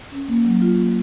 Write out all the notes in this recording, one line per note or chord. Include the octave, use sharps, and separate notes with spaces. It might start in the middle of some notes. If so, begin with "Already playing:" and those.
C#4
A#3
F#3
F4
A#3